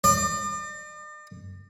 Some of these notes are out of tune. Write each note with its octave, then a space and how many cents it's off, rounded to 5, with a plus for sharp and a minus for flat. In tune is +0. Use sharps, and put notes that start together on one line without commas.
D5 +45